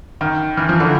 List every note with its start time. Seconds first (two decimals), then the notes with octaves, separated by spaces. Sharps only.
0.21 D#3
0.57 E3
0.69 F3
0.80 D3 E3